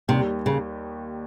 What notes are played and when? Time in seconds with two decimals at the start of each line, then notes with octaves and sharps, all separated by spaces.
0.08 D#2 C3 D#3 G3
0.46 C#3